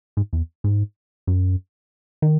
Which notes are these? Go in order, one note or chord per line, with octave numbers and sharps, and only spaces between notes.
G#2
E2
G#2
F#2
D#3